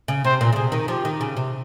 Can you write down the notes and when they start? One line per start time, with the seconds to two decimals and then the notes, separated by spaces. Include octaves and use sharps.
0.08 C#3
0.24 C3 C5
0.41 A#2
0.53 C#3
0.56 C3 G#4
0.72 D#3
0.88 F3 G4
1.05 D#3
1.21 C#3
1.37 C3